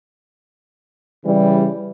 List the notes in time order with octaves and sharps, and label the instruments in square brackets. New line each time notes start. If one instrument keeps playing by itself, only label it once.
[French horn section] C#3 E3 G3